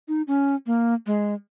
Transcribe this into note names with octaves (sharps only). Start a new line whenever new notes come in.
D#4
C#4
A#3
G#3